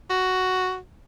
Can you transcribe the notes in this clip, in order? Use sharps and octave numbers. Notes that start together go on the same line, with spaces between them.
F#4